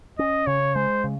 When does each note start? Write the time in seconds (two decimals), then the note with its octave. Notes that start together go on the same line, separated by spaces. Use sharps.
0.19 C#4 D#5
0.47 C#3 C#5
0.75 G#3 C5
1.04 C#3